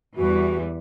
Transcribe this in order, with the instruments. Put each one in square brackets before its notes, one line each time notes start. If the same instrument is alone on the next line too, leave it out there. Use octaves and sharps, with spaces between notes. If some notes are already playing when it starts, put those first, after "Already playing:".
[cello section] E2 E3 G3 [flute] F#4